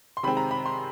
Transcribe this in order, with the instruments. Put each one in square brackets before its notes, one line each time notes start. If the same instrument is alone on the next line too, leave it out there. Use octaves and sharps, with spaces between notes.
[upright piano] C6
C3 D#3 G#3 C4 B5
A#5
B5
C6